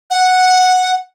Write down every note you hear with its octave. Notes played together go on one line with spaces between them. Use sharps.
F#5